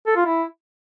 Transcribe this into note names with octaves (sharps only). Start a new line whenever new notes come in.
A4
F4
E4